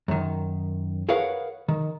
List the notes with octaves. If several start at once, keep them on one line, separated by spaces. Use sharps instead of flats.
F#2 D#3
G#4 A#4 B4 C#5 F5 F#5
D#3